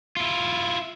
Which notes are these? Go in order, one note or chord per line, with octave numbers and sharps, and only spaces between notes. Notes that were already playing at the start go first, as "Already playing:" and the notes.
E4 F4